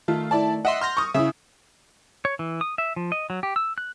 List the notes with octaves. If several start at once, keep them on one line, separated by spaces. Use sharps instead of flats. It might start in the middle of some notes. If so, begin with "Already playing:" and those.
D#3 A3 F4
E4 D5 A5
D#5 E5 F#5 C6
C6 F6 G6 A#6
C#6 D#6
C#3 E4 E5
C#5
E3
D#6
E5
F3
D#5
F#3
G4
E6
F#6